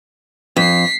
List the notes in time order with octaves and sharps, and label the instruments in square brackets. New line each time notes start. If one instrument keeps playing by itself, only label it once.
[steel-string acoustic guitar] F2 [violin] B6 C7